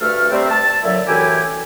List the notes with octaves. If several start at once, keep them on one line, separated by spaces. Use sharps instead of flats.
D2 G2 A3 A4 F6
C3 G3 A3 C4
A5
A#2 D3 F#3 E5
F#2 A2 E3 E4 G4 G#5